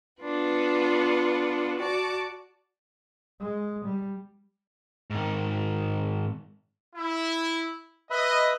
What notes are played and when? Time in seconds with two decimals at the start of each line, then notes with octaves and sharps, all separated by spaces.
0.22 B3 D4 F4 B4
1.79 F#4 D5 A5 D6
3.40 G#3
3.85 G3
5.10 G#2 D#3
6.94 E4
8.10 B4 D#5 E5 B5